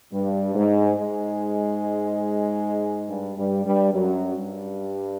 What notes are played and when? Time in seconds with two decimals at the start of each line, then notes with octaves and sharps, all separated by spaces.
0.13 G2 G3
0.56 G#2 G#3
0.98 G#2 G#3
3.09 G2 G3
3.37 G2 G3
3.65 G2 G3
3.93 F#2 F#3
4.35 G2 G3